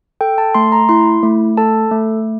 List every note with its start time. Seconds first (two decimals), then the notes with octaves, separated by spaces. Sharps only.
0.21 A4 G5
0.38 A5
0.55 A3 C6
0.72 A#5
0.89 E4 C6
1.23 A3
1.57 A4 A5
1.91 A3